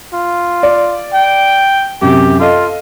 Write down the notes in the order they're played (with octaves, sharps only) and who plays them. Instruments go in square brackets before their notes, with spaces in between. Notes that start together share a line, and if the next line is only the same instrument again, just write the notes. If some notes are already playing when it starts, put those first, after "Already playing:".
[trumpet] F4
[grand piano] D5
[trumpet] G5
[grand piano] F#2 C3 [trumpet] G4
[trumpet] F4 [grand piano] A4 D#5